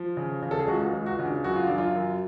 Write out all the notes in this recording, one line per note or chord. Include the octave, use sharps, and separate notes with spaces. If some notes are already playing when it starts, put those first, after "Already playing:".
Already playing: F3
C#3
C#3
A4
G#4
C#2 F#4
C#2
F#4
C#3
D4
F#2 F#4
F4
F#2 D4
F4
F#2